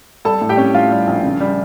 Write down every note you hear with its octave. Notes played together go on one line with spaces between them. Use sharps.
G3 A4 A5
A2
G4 G5
C#4
A2 F4 F5
G3
A#1
C#3
G3